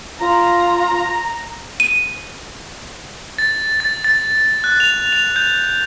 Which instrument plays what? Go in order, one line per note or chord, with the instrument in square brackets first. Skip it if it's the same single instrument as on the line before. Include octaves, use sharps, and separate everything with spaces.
[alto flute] F4 [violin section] A#5
[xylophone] D#7
[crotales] A6
A6
A6
F#6
F7
F7
G6